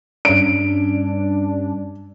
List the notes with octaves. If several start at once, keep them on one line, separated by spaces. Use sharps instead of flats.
G2 C#4 D4 D7